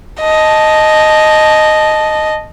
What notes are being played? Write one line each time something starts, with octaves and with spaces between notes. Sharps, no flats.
D#5 A5